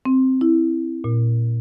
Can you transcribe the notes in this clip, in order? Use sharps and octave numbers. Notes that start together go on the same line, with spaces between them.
C4
E4
A#2